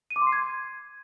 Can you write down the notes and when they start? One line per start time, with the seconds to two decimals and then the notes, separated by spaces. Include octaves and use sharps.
0.10 D#7
0.16 D6
0.21 C6
0.27 C7
0.32 G#6